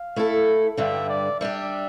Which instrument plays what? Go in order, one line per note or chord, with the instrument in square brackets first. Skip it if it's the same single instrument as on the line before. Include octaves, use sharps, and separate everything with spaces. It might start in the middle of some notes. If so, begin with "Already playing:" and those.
Already playing: [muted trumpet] F5
[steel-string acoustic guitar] A3 E4 A4
[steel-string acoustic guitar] G2 D3 G3 [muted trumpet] E5
[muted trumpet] D5
[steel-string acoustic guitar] G3 D4 G4 [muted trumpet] E5